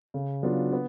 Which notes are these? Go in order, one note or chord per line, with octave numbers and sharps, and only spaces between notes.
C#3
F#3 B3 D4 F4
B3